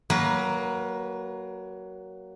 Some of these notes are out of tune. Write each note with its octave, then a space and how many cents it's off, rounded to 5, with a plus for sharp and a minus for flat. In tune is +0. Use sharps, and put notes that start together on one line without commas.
F#3 +15 A#3 +10 B4 -15